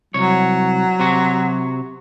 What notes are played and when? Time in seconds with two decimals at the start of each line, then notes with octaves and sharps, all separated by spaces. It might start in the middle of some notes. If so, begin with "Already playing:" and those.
0.14 C2 F#3 C#5
1.00 C3 F#4